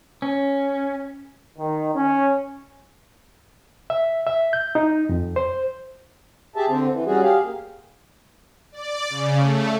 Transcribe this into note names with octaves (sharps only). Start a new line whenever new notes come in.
C#4
D#3
C#4
E5
E5
G6
D#4
F2
C5
G4 G#4 E5 A5
D3 C4
E3
G3 C#4 F#4 G#4
G4 G#4 F5
A#3
D5
C#3
A3